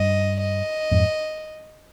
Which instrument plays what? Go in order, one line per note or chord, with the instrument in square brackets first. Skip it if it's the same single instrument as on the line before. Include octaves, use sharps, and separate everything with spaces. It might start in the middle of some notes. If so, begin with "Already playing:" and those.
Already playing: [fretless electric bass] G2 [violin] D#5
[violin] D#5
[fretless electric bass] F2 G#2